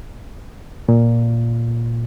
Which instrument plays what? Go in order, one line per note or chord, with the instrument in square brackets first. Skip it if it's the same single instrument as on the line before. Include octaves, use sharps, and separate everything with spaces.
[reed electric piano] A#2